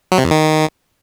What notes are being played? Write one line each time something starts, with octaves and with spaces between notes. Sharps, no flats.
F#3
C3
E2
D#3